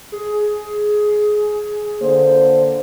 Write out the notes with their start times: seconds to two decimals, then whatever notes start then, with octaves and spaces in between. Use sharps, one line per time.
0.12 G#4
2.01 D3 A#3 C5